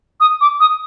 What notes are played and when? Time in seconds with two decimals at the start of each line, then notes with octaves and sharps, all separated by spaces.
0.20 D#6
0.41 D6
0.60 D#6